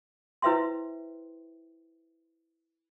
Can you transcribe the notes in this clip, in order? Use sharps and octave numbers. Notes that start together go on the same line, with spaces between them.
E4 B4 C5 E5 G5 C6